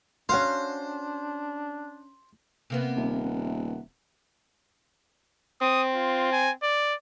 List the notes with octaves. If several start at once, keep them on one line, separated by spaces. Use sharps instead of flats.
C#4 D4 F#4 C5 F5
C3 A#3 B3
D#1
C4 D#6
F4
G#5
D5